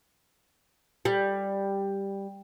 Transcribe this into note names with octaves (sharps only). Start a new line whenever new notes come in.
G3